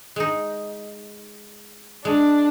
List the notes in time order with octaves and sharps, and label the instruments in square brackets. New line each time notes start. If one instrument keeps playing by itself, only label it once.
[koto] G#3 D#4
[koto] G#3 [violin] D4